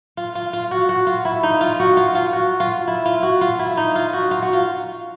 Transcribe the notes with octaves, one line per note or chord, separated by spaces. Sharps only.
F4
F4
F4
F#4
F#4
F4
E4
D#4
F4
F#4
F4
F4
F#4
F4
E4
F4
F#4
F4
E4
D#4
F4
F#4
F4
F#4
F4